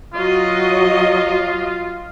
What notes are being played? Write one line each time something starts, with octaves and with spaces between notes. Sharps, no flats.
F#3 F4 D#5